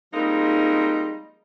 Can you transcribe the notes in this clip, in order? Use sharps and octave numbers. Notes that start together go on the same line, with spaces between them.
F3 G3 G#3 A#3 C4 D#4